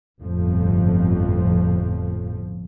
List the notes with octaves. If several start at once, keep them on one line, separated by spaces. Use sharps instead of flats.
G1 F2 A2 F3